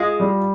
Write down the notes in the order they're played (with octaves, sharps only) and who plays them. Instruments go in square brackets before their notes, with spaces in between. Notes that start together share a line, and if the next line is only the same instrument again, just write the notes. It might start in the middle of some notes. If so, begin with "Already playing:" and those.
Already playing: [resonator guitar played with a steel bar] G#3 [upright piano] F4
[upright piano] G3